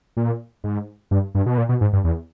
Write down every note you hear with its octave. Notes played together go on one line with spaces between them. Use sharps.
A#2
G#2
G2
G2
B2
A#2
B2
G#2
G2
E2